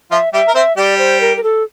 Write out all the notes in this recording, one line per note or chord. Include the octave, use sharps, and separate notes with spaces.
F3 F4 E5
G3 G4 E5
A#4
C4 C5 E5
G3 G4 D5
C5
A#4
A#4
A4